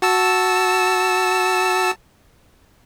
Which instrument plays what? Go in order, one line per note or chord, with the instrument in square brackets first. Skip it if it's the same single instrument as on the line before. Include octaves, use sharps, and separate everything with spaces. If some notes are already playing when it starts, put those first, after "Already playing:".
[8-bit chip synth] F#4 A5 E6